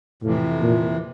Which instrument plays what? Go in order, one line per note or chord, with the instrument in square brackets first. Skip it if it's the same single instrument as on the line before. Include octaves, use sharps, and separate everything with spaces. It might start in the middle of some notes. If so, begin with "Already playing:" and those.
[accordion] F2 C3 E3 [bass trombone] A2
[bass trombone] A#2